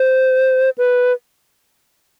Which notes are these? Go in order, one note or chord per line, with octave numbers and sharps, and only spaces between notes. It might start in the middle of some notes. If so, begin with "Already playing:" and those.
Already playing: C5
B4